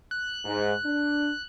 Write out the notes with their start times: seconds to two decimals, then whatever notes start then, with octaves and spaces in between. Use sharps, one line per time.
0.11 F#6
0.44 G#2
0.84 D4